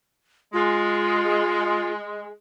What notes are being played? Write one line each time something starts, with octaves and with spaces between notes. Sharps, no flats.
G#3 F4